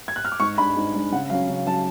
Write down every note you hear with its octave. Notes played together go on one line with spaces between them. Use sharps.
G#6
F#6
F6
D6
G#2 C#6
G#3 D4 B5
G#2
G#3 D4
C#3 F#5
F#3 C#4 F5
C#3
F#3 C#4 A5